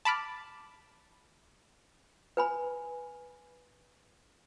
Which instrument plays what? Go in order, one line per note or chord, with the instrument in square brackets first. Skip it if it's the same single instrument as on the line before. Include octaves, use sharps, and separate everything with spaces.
[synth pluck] A5 B5 D6 F6
[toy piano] B4 G#5 B5